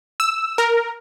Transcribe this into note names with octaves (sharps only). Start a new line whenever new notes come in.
E6
A#4